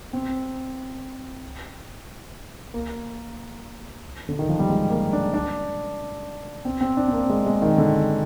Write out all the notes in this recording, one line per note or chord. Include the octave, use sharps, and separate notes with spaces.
C4
A#3
D3
D#3
F3
G3
G#3
A#3
D4
D4
C4
C4
D4
C4
A#3
G#3
G#3
D#3
D3